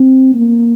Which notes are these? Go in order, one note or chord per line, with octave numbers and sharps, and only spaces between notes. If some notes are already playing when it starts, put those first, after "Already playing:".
Already playing: C4
A#3